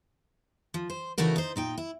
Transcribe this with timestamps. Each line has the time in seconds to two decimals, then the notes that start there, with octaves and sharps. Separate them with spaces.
0.74 F3
0.90 C5
1.18 C#3 E3 A3 D#4 F#4 A#4
1.36 D#4 C5
1.56 A#2 D#4 G5
1.78 E4